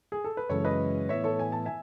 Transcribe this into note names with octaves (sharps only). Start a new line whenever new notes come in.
G#4
A4
B4
F#2 C#3 E3 G#3 C#4 A4 C#5
B4 D#5
A2 E3 B3 E4 C#5 E5
A4 C#5
G#5
A5
E5 G#5